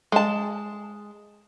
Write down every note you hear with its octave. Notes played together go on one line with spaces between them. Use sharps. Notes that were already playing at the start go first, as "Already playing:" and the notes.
G#3 A5